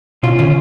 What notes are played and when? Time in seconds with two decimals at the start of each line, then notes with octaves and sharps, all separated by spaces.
0.23 B2 C#4 F4
0.39 D3 C#4 F4